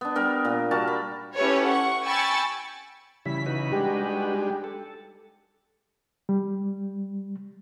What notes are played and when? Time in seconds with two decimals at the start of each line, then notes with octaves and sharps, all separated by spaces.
0.01 B3 D4
0.16 G3 B3 D4 A#4
0.45 A#2
0.71 G3 F#4 A#4 A5
0.88 B5
1.35 C#4 E4 G4 A4 B4 C#5
1.67 F#5 C#6
2.04 G5 G#5 B5 C#6 E6 A6
3.26 C#3 E3 G3 E4 B6
3.46 D#4 F#4 B4
3.72 G3 G#3 D4 G4
4.64 A4
6.29 G3